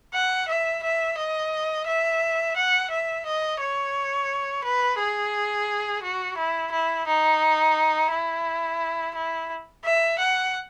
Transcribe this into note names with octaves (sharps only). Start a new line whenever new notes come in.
F#5
E5
E5
D#5
E5
F#5
E5
D#5
C#5
B4
G#4
F#4
E4
E4
D#4
E4
E4
E5
F#5